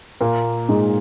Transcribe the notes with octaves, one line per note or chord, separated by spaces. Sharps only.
A#2 A#3
G#2 G#3